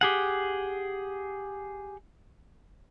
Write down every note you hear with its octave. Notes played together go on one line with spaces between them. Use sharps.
G4 G#4 F#5